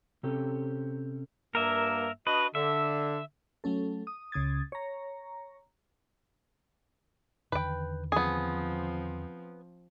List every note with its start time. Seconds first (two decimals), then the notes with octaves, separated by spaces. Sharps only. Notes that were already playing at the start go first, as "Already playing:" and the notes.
0.23 C3 C4 C#4 G4 A4
1.55 G2 A#3 A#4 E5
2.27 D4 F#4 B4 D#5
2.55 D3 E5
3.64 F#3 A3 C#4 A4
4.07 D#6
4.32 C#2 C#3 D#6 G#6 A6
4.72 C#5 A#5
7.52 E2 D3 D#3 B4 G5
8.12 F3 B3 C4 G#4